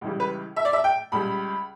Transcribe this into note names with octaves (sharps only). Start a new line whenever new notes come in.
C#2 C#3 E3 G3
B4
E5
D5
E5
G5
C#2 C#3 G3 B5